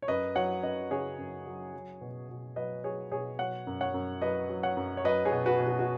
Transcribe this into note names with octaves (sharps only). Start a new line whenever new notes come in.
C#5
F#2 B4 D#5
F#3 C#5 F#5
F#2 B4 D#5
C#3 G#4 C#5
F#2
F#3
F#3
B2
B2
F#3 B4 D#5
F#3 G#4 C#5
B2 G#4 C#5
F#3 C#5 F#5
F#2
C#5 F#5
F#2
F#3 B4 D#5
F#3
C#5 F#5
F#2
C#5
F#3 B4 D#5
G#4 C#5
B2
F#4 B4
B2
F#4
F#4